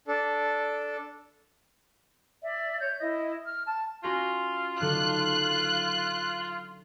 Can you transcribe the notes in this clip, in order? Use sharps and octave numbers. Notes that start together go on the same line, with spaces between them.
D4 A4
D5 E5
C#5 G6
E4 D#5
F6
A5
C#4 F4 F#4 A#6
D3 F#3 D#4 F#6